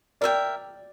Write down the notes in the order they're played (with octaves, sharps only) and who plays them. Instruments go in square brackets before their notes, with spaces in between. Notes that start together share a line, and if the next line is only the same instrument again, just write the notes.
[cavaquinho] A#4 E5 G5 [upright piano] D5